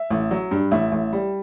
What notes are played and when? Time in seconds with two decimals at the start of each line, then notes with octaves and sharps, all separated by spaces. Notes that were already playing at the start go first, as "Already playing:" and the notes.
Already playing: E5
0.10 A1
0.31 F#3
0.51 G2
0.71 A1 E5
0.92 A1
1.13 G3